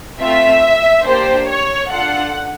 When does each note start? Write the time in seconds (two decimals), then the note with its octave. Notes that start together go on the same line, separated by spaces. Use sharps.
0.20 A3 C4 F4 E5
1.05 A#3 D4 G4 C5
1.49 C#5
1.90 D4 F4 A4 F#5